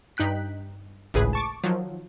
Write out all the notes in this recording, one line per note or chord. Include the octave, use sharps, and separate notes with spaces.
G2 D#4 G5 F#6 B6
G#1 C#2 A2 G#4 B4
A5 C#6 D6
D#3 F3 F#3